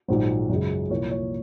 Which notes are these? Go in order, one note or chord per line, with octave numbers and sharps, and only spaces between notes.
A#1 G#2 D#3 F#3 C5
F#2 C#3 G#3
C2 A#2 F3 A#3 C#5
C#5